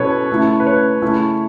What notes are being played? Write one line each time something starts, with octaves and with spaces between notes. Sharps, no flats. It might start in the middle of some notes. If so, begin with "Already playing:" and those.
Already playing: B2 F#3 C#4 E4 A4 B4 C#5
C#3 A3 E4
B4
C#5
C#3 A3 C#4 E4